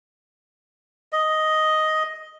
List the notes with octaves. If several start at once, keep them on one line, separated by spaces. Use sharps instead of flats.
D#5